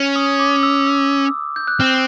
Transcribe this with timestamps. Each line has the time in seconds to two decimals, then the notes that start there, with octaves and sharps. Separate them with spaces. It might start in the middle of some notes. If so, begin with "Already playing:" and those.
Already playing: C#4
0.16 D#6
0.40 D6
0.63 E6
0.87 E6
1.56 G6
1.67 F#6
1.80 C4 F6